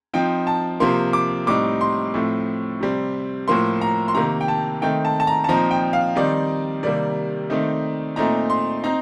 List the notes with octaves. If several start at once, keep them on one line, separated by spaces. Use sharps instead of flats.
F3 C4 D#4 G5
A5
C3 F3 A#3 C6
D6
A2 G3 C4 D#4 D6
C6
A2 F3 A3 C4
C3 G3 C4
A2 F3 A#3 C6
A#5
C6
C3 D#3 A#3 A#5
G5
A5
D#3 A3 C4 D#4 G5
A5
A5
A#5
A5
A#2 F3 C4 D#4 A#5
G5
F5
D#3 G3 C4 D#4 D5
C3 D#3 G3 A#3 D5
D#3 A3 C4 D#4
A#2 A3 C4 D#4 A#5
C6
C4 D#4 A#5